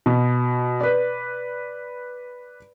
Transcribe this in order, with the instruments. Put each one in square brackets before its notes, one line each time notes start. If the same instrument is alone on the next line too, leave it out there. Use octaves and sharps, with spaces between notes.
[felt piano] B2
B4 D5